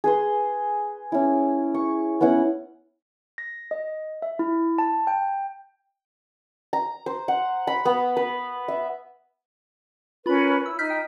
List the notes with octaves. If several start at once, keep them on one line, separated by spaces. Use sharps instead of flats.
G#4 B4 C6
C#4 E4
C#6
B3 C#4 E4 F#5
A#6
D#5
E5
E4
A5
G5
A#5
C5
F#5
B5
B3
B4
E5
C#4 F4 A#4 B4 B5
E4 E6
D#4 F6 G6 B6
G5